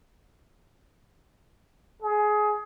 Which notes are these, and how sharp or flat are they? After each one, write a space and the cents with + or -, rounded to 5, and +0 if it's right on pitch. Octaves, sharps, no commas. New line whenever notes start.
G#4 +20